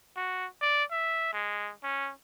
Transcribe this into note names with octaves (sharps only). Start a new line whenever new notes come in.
F#4
D5
E5
G#3
C#4